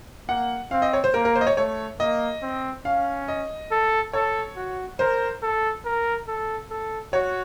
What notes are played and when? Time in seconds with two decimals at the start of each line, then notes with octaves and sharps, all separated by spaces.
0.29 A#3 F#5
0.71 C4 F5
0.82 D#5
0.93 C#5
1.04 C5
1.14 A#3 A#4
1.25 A#4
1.36 C5
1.41 D#5
1.47 C#5
1.57 A3 C#5
1.99 A#3 D#5
2.42 C4
2.85 C#4 F5
3.28 D#5
3.71 A4
4.13 A4 C#5
4.56 F#4
4.99 A#4 C5
5.42 A4
5.85 A#4
6.28 A4
6.70 A4
7.13 F#4 C#5